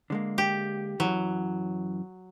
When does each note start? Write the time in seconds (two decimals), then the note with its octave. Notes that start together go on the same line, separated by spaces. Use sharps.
0.10 D3 G#3 A#3
0.38 G4
1.00 F#2 E3 F#3